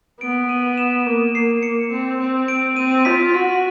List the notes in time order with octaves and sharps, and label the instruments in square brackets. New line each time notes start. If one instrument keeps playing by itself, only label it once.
[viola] B3 [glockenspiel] D7
[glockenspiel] D#7
E7
[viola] A#3
[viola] A#3 [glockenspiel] C7
[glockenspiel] C#7
[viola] C4
C4
[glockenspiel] D7
[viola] C4 [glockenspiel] D#7
[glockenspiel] D#7
[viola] F4 [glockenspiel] B6
[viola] F#4